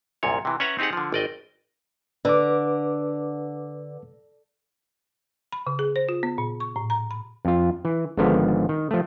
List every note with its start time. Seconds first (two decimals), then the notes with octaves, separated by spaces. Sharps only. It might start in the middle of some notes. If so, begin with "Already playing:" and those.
0.23 C2 F#2 A#2 C#5
0.45 C3 E3
0.60 C#4 B4 C#5 E5 F#5 A#5
0.79 C4 D#4 G4 G#4 F#5
0.93 D3 F3
1.12 G#1 D5 D#5 G5
2.25 D3 B4 D6
5.53 B5
5.67 C#3
5.79 G#4
5.96 C5
6.09 F4
6.23 B3
6.38 A#2
6.60 C#6
6.76 A2
6.90 A#5
7.11 B5
7.45 F2 F4
7.85 E3
8.17 G#1 G#2 D3 D#3 F3 B3
8.69 D#3
8.91 F3 A3